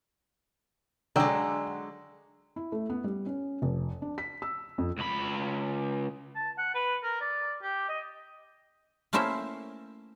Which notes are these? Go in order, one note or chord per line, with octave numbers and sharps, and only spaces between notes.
D3 F#3 G#3 D4 G5 E6
E4
A3
B3
G3
C#4
F1
D4
B6
E6
F2
C#2 B5
A5
F#5
B4
A#4
D5
G4
D#5
A3 A#3 C#4 E4 C5 E5